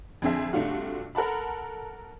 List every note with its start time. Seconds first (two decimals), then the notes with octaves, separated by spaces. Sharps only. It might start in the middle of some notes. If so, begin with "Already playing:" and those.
0.22 F2 D3 C4 D4 G#4 E5
0.53 G2 C3 A3 D4 F4 F#4
1.15 A4 A#4 F#5 A5 B5